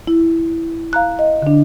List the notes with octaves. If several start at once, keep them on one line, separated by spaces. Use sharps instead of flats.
E4
F5 A#5 F#6
D#5
D3 D4